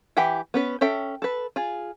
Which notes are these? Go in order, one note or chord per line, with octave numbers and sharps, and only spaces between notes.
E3 G4 E5 F#5 G5
B3 C#4 B4
C#4 A4 E5 G5
A4 B4
F4 G#4